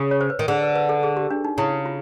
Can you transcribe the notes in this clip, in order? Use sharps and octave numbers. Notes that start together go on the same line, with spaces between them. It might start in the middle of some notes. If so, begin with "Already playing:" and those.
Already playing: C#3
C#5
C5
B4
D#3
D3 G#4
B4
B4
A4
G#4
G4
D4
D#4
C#3 E4
F4